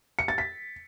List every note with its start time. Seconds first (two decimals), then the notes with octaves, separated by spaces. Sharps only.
0.19 C#7
0.28 A6
0.38 B6